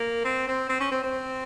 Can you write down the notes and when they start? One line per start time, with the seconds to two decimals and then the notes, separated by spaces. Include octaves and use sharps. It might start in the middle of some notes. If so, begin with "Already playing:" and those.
Already playing: A#3
0.24 C4
0.48 C4
0.69 C4
0.80 C#4
0.91 C4
1.04 C4